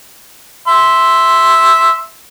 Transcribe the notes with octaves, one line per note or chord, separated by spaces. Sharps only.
E5 C6